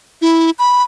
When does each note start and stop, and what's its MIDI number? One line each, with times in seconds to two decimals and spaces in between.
0.22 0.50 64
0.59 0.83 83